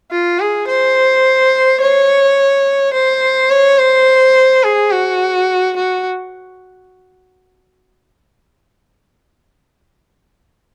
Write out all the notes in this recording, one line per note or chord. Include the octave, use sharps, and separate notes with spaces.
F4
G#4
C5
C#5
C5
C#5
C5
G#4
F#4
F#4